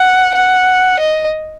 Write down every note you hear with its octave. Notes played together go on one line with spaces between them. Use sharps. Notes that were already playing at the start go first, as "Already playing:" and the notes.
Already playing: F#5
F#5
D#5